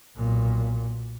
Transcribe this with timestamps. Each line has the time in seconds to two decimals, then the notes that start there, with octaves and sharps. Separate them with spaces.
0.17 B1 A#2